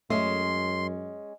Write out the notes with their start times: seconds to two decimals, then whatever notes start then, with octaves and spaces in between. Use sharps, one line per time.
0.10 F#2 G#3 A3 C#4 C6